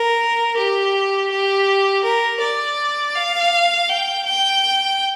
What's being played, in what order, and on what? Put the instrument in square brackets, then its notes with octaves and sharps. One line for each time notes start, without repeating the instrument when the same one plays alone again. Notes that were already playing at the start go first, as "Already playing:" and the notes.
Already playing: [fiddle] A#4
G4
G4
A#4
D5
F5
G5
G5